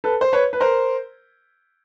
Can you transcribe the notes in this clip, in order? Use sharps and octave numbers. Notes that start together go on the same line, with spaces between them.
A4 B4
C5
B4 C#5
B4
A#4 C5